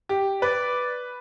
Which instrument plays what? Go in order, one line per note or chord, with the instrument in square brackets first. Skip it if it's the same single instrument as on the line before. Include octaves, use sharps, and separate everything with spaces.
[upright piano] G4
[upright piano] B4 [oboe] D5